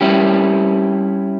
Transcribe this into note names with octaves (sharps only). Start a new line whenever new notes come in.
G3 C#4 E4 G4